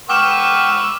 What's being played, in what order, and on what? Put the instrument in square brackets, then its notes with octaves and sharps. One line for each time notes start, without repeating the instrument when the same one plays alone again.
[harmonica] B4 C#6 E6 [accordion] F#5 G5 [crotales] D6 F6 E7